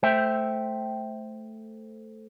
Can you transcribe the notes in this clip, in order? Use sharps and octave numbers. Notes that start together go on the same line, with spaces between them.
A3 C5 E5 G5